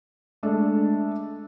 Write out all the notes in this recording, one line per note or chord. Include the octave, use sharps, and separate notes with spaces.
G#3 A3 D4 A4